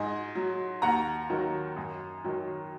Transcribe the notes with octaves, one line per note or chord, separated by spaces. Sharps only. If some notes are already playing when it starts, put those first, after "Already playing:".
Already playing: G#2 D#5 G#5
F#3
D#2 F#5 A#5
D#3 F#3
F#2
D#3 F#3